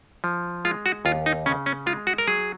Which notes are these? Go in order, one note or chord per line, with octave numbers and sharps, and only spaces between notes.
F3
G#3 F4
F#4
D#2 F4
D#4
C#3 C#4
C#4
G#3 F4
F#4
A#4
F#3 G#4